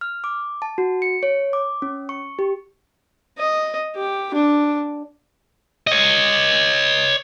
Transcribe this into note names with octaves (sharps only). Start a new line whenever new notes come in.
F6
D6
A5
F#4
C#7
C#5
D6
C#4
C#6
G4
D#5
G4
D4
C#5 D#5